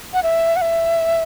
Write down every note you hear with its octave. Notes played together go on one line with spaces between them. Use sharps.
F#5
E5
F#5
E5